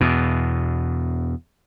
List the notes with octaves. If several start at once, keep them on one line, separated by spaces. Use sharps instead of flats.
E2 B2